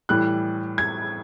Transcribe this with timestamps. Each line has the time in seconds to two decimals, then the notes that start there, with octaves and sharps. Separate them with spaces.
0.09 A2 E3 G3 F#6
0.78 G#6